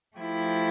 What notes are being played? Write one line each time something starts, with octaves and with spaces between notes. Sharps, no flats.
F3 A3 E4 G4